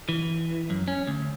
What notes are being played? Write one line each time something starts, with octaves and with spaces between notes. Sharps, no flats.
E3
F#2
C#4
D2